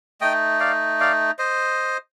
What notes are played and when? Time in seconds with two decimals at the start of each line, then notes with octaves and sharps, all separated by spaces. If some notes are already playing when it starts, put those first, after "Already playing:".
0.21 A3 D#4 D#5 G5
0.60 D5 F5
1.00 D5 F5
1.39 C5 D#5